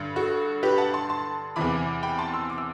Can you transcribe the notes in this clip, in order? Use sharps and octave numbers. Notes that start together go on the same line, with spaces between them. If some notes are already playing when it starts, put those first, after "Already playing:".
Already playing: G2 D3
F#4 A4
G4 B4
F#5 A5
A5 C6
A5 C6
E2 C3 E3 B5 D6
G5 B5
A5 C6
C6 E6
D6
E6